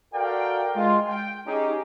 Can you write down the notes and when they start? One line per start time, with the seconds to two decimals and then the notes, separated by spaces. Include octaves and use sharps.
0.14 F#4 A4 A#4 D5 F5 G5
0.76 G#3 F4
1.09 G5
1.47 C#4 D#4 G4 G#4